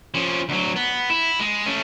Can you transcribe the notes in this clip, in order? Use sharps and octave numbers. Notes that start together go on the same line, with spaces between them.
F3 C#4
D2 F#3
B3
E4
G#3
A3 C#4